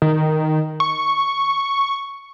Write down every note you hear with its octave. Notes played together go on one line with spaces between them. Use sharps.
D#3
C#6